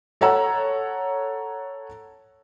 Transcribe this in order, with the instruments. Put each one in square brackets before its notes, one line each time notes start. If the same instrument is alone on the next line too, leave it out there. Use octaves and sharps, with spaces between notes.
[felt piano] A4 C#5 F#5 A#5 E6